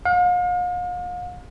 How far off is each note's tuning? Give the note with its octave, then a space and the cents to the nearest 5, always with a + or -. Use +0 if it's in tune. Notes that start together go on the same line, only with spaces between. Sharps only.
F5 +40